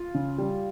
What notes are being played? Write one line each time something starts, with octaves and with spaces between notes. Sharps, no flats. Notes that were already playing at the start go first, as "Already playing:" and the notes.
Already playing: F4
C#3
G3